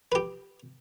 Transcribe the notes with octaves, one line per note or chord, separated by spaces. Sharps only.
G4 B4